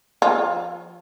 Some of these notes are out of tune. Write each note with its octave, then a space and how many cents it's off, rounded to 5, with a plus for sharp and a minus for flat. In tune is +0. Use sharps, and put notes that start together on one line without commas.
F3 -10 F4 +20